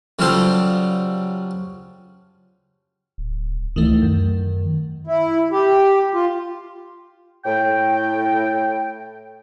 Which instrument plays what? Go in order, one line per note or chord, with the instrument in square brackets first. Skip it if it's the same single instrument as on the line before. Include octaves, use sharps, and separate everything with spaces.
[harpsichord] C#3 F#3 G3 F4 A4 C5
[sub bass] D1
[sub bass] C#2 [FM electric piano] D#3 E3 A3
[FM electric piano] F#2 [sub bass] D#3
[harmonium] E4
G4
F4
[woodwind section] A2 G5